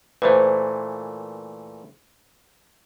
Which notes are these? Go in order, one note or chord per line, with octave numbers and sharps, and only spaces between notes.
A#2 E3 A3 B4 C5